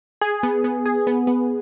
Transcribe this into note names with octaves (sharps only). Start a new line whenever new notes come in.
G#4
B3
B3
G#4
B3
B3